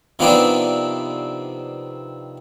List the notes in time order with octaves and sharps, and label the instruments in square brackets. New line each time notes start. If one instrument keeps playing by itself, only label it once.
[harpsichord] C3 D#3 F3 B3 C4 D4